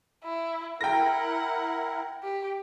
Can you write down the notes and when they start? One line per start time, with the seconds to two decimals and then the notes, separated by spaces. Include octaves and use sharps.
0.24 E4
0.81 E4 A#4 F#5 G5 A#6
2.23 G4